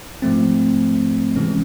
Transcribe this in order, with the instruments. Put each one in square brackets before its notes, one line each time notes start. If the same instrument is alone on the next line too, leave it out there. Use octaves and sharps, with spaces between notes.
[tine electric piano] G#2 F3 A3 C4
C3 E3 G#3 C#4